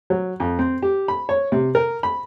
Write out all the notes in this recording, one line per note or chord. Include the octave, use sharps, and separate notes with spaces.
F#3
F2
C4
G4
B5
C#5
C3
A#4
B5